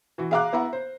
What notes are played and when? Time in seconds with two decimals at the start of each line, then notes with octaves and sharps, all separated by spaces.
0.18 E3 F#4
0.31 G#4 E5 F5 A#5 D6 F#6
0.53 B3 E4 F#5 A#5
0.73 C5